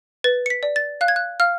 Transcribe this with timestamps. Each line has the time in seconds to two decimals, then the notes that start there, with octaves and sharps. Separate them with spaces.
0.24 B4 A6
0.46 C#7
0.50 B6
0.63 D5
0.76 A6
1.01 F5 F#6
1.08 G#6
1.16 F#6
1.40 F5 F6